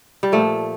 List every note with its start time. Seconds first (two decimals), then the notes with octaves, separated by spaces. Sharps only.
0.23 G3
0.32 A#2 F3 A3